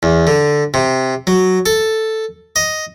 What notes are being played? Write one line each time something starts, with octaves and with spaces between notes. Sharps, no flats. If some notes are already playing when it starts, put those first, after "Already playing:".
E2
D3
C3
F#3
A4
D#5